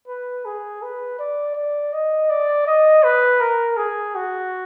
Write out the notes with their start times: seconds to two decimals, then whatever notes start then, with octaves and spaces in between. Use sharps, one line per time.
0.08 B4
0.45 G#4
0.82 B4
1.19 D5
1.56 D5
1.93 D#5
2.30 D5
2.67 D#5
3.03 B4
3.41 A#4
3.77 G#4
4.15 F#4